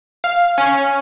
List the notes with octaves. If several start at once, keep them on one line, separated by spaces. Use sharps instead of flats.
F5
C#4